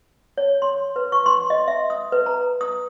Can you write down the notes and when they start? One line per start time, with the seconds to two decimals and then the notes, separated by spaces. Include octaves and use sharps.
0.38 C#5
0.62 C6
0.96 B4
1.12 C#6
1.26 C6
1.50 D#5
1.68 E5
1.90 D#6
2.12 B4
2.26 A#5
2.61 D#6